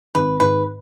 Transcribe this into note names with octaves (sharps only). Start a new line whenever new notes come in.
G#1 B4
G#2 D#3 B4